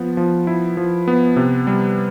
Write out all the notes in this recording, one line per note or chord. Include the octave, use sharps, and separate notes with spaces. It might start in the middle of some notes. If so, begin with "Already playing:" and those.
Already playing: F3 B3
F3
E4
F3
B3
C3
G3